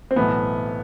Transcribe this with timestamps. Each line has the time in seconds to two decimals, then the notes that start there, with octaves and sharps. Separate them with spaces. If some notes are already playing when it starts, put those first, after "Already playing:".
0.11 C4
0.16 B1 A2 E3 B3